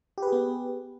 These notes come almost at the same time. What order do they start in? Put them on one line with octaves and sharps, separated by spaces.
G4 B4 G#4 B3